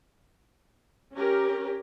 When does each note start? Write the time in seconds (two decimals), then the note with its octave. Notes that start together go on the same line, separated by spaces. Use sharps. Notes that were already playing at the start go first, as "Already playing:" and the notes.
1.13 C#4 G4 A#4